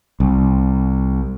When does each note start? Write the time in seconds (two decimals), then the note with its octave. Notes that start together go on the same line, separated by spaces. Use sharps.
0.20 C2